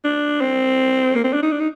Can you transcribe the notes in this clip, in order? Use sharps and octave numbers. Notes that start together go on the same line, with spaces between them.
D4
C4
A#3
C4
D4
D#4
D4
D#4